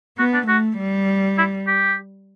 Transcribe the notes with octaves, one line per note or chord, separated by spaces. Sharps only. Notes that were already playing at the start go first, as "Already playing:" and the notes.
B3 F#4
D4
A3 F#4
G3
E4
G4